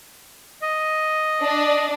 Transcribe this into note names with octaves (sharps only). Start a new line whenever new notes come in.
D#5
D4